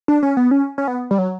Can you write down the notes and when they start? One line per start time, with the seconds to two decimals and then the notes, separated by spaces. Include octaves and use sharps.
0.08 D4
0.23 C#4
0.37 B3
0.51 C#4
0.78 C#4
0.88 B3
1.11 G3
1.18 F#3